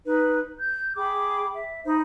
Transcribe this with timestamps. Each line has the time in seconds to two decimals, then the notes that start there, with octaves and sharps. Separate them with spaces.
0.05 D#4 B4
0.58 G6
0.96 G#4 G5 B5 D6
1.53 E5
1.84 D#4 C5 B5